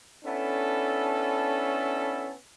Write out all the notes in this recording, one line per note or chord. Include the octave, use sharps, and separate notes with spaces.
B3 C#4 D4 E4 A4